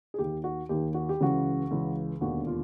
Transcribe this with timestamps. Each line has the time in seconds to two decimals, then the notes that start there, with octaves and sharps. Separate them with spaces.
0.14 G#4
0.19 D#2 D#3 G4
0.44 F#4
0.69 D#2 D#3 G4
0.94 F#4
1.09 G4
1.20 C#2 C#3 E3 F#4
1.71 C#2 C#3 E3
2.21 E1 D#2 D3 F#4
2.47 F4